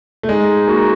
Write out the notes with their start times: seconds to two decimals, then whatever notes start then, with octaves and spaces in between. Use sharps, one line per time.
0.23 A3
0.28 G#3 D#4
0.67 A#3 F#4